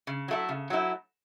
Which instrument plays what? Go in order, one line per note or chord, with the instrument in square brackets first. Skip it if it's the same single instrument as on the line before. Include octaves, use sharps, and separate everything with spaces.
[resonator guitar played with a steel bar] C#3
F#3 A3 E4
C#3
F#3 A3 E4